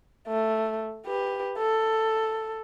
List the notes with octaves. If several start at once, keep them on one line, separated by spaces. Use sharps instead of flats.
A3
G4 B4
A4